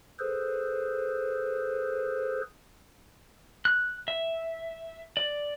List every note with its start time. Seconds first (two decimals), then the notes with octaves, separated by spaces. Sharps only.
0.19 G#4 A4 B4 C5
3.65 F#6
4.08 E5
5.17 D5